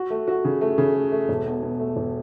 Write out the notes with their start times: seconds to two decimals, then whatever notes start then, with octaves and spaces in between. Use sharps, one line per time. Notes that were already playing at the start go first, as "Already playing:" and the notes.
Already playing: F#4
0.10 A3
0.27 F#4
0.45 C#3
0.61 A3
0.78 C#3
0.95 A3
1.12 A3
1.29 E1
1.46 B2
1.62 B2
1.80 A3
1.96 E1